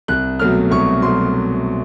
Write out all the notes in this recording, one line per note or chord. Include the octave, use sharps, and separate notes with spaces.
C2 F#6
B2 F#3 A3 F6
C2 C#6
B2 F#3 A3 C6